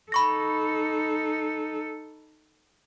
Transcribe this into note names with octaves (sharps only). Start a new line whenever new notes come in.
D#4 A4 B5 C#6 A#6